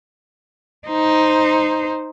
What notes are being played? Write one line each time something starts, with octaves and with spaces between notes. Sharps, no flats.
D#4 C5